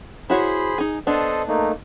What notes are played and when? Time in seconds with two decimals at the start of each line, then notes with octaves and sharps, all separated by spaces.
0.30 E4 F#4 G#4 C5 C#5 B5
0.78 D#4 G#4
1.07 B3 D4 A4 C5 D#5
1.48 A3 A#3 D#4